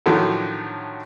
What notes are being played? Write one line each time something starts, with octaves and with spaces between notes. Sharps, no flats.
A2 D3 D#3 F3 F#3